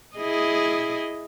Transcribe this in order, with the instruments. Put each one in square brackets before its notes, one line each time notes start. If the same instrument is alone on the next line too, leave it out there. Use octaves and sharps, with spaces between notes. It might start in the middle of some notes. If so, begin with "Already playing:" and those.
[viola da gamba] E4 G#4 D#5